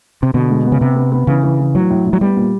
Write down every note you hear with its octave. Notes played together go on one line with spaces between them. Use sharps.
C3
B2 D3
G#3
B3
C#3
C3 B3
B3
B3
C#3 E3
E3
E3
A2 F#3
A2
A2
F#3
G3 B3
A#2